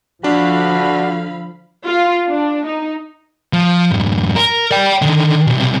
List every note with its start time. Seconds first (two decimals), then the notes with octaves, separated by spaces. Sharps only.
0.24 D3 F3 D4 F#4 F5 B5
1.86 F4
2.28 D4
2.66 D#4
3.53 F3
3.91 F2 G#2
4.36 A#4
4.71 D5 G5
5.02 D3 D#3
5.47 B1 C3